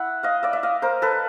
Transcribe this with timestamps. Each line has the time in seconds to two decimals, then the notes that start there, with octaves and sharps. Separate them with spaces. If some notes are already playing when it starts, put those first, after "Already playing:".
Already playing: E4 E5 F#5
0.23 D#5 F5
0.43 D5 E5
0.53 E5
0.63 D#5 F5
0.82 A#4 C5
1.02 A4 B4